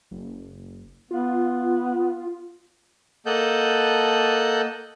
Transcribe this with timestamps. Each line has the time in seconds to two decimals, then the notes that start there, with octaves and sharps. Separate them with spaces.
0.11 F#1
1.11 B3 F4
3.26 A#3 A4 D#5 F#5 A5 G6